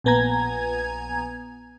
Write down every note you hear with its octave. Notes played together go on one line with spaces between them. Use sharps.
A#1 A#2 B3 G#5 A#5 G#6